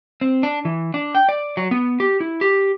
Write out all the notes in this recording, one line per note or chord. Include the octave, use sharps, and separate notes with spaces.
C4
D4
E3
D4
G5
D5
F#3
B3
G4
E4
G4